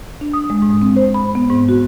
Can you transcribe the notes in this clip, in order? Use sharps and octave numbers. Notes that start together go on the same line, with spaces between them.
D4
D#6
G#3
G#2
C4
C5
B5
B3
G#2
F#4